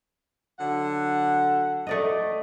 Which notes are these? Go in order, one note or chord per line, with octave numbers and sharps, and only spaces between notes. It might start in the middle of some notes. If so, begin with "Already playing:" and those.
D3 F#3 F#5
A3 D5 D#5